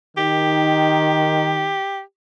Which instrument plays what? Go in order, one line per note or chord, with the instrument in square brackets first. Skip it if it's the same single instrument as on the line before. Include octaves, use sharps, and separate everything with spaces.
[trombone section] D#3 D#4 [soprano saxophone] G4